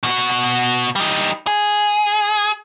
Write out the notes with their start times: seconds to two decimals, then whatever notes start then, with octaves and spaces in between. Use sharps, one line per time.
0.03 B2 F#4
0.96 G3 D#4
1.47 G#4